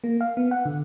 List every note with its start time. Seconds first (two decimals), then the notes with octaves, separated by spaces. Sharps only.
0.04 A#3
0.21 F5
0.37 B3
0.51 F#5
0.65 D3